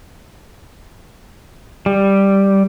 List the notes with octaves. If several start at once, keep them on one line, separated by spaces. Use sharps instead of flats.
G3